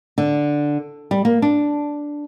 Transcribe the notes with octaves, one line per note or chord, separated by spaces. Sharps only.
D3
G3
A#3
D4